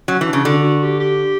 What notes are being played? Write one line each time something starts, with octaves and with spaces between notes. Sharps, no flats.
F#3 C#4
E3
D4
C#3
D3 F#4
F#4
G4
G4